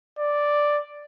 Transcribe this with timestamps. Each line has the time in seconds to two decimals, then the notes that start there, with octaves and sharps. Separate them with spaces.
0.19 D5